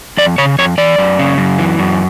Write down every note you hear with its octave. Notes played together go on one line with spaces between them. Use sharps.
F2 D5
C#3 C#5
F2 C#5
E3 D5
F#2
C#3
F#2
E3
F#2